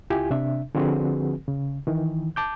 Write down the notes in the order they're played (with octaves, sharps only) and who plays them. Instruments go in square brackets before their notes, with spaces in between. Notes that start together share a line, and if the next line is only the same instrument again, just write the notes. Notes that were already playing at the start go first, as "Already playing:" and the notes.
[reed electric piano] C#2 E4 F4 G4 G#5
C3 D4 E5
D3 F3 C4 F#4 G#4 B4
C#3
D#3 E3
A5 D6 G6